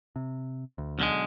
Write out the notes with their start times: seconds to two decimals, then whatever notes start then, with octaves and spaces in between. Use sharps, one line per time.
0.16 C3
0.78 D2
0.99 B1 D3 G#3